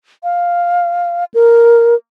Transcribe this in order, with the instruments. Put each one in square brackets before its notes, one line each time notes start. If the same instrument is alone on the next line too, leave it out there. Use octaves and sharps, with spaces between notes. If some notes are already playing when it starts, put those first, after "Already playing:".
[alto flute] F5
A#4